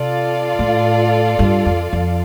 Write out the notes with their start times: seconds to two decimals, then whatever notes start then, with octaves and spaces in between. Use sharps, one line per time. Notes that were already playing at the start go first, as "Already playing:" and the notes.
Already playing: C3 F4 A4 D5 F5
0.59 A2
1.39 G2
1.66 F2
1.93 F2